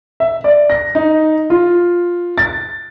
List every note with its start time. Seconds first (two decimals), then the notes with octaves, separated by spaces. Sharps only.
0.20 E5
0.44 D5
0.70 A#6
0.95 D#4
1.50 F4
2.38 A6